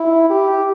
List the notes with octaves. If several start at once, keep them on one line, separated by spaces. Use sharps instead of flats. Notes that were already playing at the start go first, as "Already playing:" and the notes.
Already playing: E4
G4